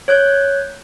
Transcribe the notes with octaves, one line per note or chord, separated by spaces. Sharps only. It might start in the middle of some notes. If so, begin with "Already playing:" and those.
C#5 F#6 G6